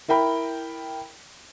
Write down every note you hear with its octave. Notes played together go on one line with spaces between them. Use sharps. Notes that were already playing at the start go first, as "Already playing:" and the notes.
E4 A#4 G5 B5